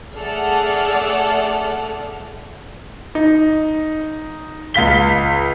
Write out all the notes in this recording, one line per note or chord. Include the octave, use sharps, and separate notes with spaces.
A3 G#4 A4 D5 F#5 F6
D#4
C#2 F5 B6 G7